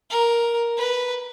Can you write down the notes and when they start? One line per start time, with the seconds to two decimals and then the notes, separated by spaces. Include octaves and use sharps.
0.10 A#4
0.78 B4